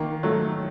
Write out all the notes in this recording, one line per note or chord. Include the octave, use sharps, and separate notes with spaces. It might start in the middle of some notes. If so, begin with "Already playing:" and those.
Already playing: D#3 A#3
F#3 A3